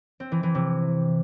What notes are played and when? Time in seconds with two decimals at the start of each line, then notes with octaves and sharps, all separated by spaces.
0.20 C4
0.32 E3
0.43 E3
0.55 C3